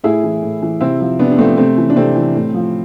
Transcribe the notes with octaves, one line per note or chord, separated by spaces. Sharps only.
A2 E4 G#4
E3
A2
E3
C3 C4 E4
F3
C3 B3 D4
D4
F3 A3 C4
C3 A3 C4
E3
D4
C3 A3 C4
E3
A2
F3